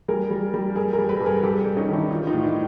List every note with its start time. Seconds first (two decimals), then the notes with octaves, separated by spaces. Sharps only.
0.08 G3 G#4 A#4
0.31 G3
0.54 G3
0.76 G2 G#4 A#4
0.93 G#4 A#4
0.99 G3
1.09 A4 B4
1.20 G2
1.26 G#4 A#4
1.43 G2 G4 A4
1.65 G2
1.77 C#4 D#4
1.89 D#3 D4 E4
2.10 E3 D#4 F4
2.27 D#4 F4
2.33 A2
2.44 D4 E4